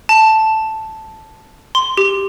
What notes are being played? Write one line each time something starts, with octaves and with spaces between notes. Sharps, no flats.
A5
C6
G4